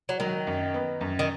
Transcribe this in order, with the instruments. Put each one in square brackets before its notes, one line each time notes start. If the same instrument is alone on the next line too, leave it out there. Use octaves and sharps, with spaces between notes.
[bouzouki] F#3
[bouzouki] D#3 [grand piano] F#3
[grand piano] F#2
B3
F#2
[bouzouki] D#3